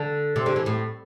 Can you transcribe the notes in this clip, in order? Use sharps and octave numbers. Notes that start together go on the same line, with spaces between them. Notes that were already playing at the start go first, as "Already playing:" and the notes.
Already playing: D3
C3
D3
E3
A2